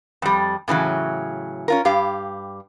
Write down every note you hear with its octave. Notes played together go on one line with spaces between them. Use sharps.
F2 G3
A2 C#3 E3 F#3
C#4 F4 A#4
G2 G4 F5